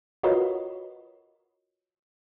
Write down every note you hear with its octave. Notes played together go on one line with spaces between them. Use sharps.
F4 F#4 A#4 B4 C#5 D#5